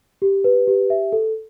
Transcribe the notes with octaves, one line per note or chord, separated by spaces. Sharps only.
G4
B4
G4
E5
A4